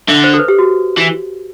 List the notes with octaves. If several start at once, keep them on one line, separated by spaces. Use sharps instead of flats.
D3 E5
C5
A4
B4
G4
F#4
E3